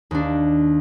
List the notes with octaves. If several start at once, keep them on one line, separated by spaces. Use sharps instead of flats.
D#2 D4